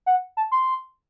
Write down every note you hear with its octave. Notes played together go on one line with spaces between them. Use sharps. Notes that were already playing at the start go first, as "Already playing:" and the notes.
F#5
A5
C6